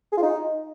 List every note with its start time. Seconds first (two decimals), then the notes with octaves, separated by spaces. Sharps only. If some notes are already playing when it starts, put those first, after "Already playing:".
0.12 G#4
0.17 F4
0.22 D#4